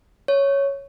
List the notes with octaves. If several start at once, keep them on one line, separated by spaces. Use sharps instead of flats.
C#5